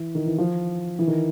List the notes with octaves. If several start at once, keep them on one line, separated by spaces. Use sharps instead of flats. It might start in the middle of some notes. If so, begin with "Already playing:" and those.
Already playing: E3
D#3
E3
F3
E3
D#3